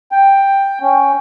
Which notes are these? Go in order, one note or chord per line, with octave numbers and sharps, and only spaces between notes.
G5
C#4